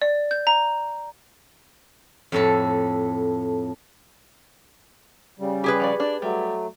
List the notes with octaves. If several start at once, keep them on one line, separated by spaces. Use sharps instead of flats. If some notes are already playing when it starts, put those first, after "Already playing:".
D5
G6
A#5
F2 A2 A4
C#3 G3
G4 G#4 B4
F3 F#4 D5
D4 D5
F#3 G3 A3